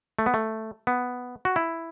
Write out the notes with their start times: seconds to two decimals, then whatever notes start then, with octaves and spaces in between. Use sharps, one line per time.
0.19 A3
0.26 B3
0.34 A3
0.87 B3
1.45 F#4
1.56 E4